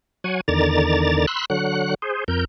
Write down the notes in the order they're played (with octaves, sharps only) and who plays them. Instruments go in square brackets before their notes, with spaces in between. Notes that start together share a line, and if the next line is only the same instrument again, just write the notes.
[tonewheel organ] F#3 F#5 G#5
E2 D3 D#3 D5 A#5 A6
B5 C6 E6 F#6
D3 F#3 F#5 F#6
G#4 C5
F2 A#4 G6